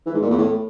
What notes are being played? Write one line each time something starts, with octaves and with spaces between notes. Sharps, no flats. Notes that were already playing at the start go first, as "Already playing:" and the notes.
E3
G#2
A#2
E2
A2